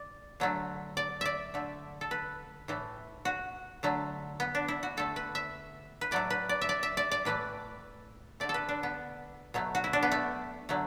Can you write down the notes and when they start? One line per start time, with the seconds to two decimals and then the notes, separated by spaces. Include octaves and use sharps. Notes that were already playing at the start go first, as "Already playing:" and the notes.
Already playing: D5
0.40 D3 F#3 A3
0.97 D5
1.21 D5 E5
1.54 D3 A3
2.01 A4
2.11 B4
2.68 A2 E3 A3
3.25 F#4
3.83 D3 F#3 A3
4.40 B3
4.55 D4
4.68 E4
4.83 F#4
4.97 D3 A3 A4
5.16 B4
5.35 E5
6.01 B4
6.11 A2 F#3 A3 D5
6.30 B4
6.49 D5
6.61 E5
6.69 D5
6.83 E5
6.97 D5
7.11 D5
7.25 A2 E3 A3 B4
8.40 D3 A3 D5
8.49 A4
8.54 B4
8.69 D4
8.83 B3
9.54 B2 F#3 A3
9.75 F#4
9.84 E4
9.93 D4
10.03 B3
10.12 A3
10.69 D3 F#3 A3